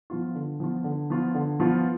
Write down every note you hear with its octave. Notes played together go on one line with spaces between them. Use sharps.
F3 B3 F4
D3
F3 B3 F4
D3
F3 B3 F4
D3
F3 B3 F4